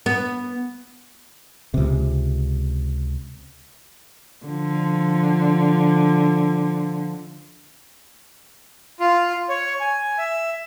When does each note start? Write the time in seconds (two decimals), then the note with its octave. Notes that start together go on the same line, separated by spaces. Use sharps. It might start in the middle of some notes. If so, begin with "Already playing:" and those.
0.06 B3
1.74 C#2 C3
4.46 D3 F3
9.00 F4
9.49 C#5
9.80 G#5
10.18 E5